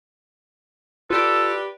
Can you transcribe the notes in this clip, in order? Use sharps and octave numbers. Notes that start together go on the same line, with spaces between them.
F4 G4 A4 B4 D5